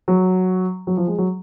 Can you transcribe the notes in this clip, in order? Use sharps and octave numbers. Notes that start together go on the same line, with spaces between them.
F#3
F#3
F3
G#3
F#3